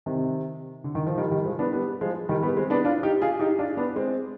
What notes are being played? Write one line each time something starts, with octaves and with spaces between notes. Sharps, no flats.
C3 D#3
D3
D#3
F3
D#3 G3
D#3 G3
F3 G#3
B3 D4
G3 B3
F3 G#3
D#3 G3
G3 B3
G#3 C4
B3 D4
D4 F4
D#4 G4
F4 G#4
D#4 G4
D4 F4
B3 D4
G#3 C4